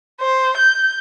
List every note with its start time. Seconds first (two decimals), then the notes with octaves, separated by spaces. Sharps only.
0.20 C5
0.58 G6